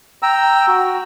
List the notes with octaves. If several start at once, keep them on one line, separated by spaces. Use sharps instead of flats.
G5 A#5 E6
F#4